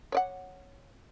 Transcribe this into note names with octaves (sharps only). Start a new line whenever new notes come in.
C#5 D5 F#5